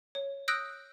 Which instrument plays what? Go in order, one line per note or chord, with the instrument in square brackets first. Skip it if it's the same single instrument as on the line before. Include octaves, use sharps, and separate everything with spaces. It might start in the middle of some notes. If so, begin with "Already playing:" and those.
[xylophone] C#5
D#6 E6 F#6 G6 A#6 D7